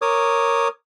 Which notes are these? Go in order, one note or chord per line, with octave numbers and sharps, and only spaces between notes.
A#4 C#5 D6 D#6